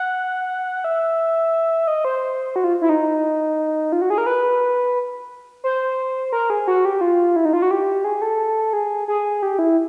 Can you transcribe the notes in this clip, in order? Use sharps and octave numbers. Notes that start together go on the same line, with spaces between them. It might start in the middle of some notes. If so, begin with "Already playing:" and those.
Already playing: F#5
E5
D#5
C5
F#4
F4
E4
D#4
F4
F#4
G#4
A#4
B4
C5
A#4
G#4
F#4
G4
F4
E4
D#4
F4
F#4
G4
G#4
A4
G#4
G#4
G4
E4